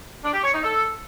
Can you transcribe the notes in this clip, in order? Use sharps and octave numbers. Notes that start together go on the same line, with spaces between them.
D4
G4
C#5
D#4
A4